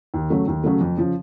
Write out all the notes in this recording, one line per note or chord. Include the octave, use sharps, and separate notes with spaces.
D#2
C#3 F#3 A3
D#2
C#3 F#3 A3
F2
C#3 F3